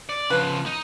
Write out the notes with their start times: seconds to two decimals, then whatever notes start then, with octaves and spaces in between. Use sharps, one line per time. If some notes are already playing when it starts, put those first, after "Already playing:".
0.09 D5
0.30 C#3 F3 B4
0.66 D#4